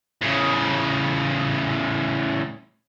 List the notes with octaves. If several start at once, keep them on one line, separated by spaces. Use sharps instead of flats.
A2 C#3